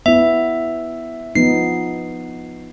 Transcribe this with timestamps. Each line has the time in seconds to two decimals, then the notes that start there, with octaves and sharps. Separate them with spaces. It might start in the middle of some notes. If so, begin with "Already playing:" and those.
0.06 B3 E4 E5
1.35 F3 B3 D#4 C7